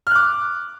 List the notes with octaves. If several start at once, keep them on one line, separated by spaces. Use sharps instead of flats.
D6 F6 F#6